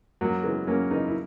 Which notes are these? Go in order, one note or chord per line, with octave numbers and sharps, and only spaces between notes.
F#2 F#3 A#3
C#3 E3 G#3 B3
F#2 A#3 C#4
C#3 E3 B3 D#4
E4